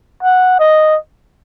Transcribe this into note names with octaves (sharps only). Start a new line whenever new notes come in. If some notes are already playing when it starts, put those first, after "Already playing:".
F#5
D#5